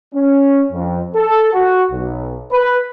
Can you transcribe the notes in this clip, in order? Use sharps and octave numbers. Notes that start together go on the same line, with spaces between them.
C#4
F2
A4
F#4
B1
B4